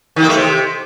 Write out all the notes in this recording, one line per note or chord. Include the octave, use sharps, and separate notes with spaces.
D#3
A#3
A3
C3